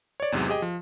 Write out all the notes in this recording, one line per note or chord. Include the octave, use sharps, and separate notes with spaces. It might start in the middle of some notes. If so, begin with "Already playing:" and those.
C#5 D5
E2 G#2 C3 F#3 G#3
G4 G#4 D#5 G5
F3